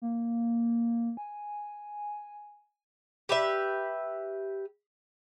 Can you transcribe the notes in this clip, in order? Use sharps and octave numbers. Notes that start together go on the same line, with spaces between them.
A#3
G#5
G4 B4 E5